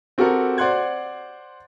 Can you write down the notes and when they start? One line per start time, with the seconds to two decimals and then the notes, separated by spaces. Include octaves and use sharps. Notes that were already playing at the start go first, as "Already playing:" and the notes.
0.18 C4 F#4 G4 A4 A#4
0.58 C5 D5 F#5 C6 F#6 G#6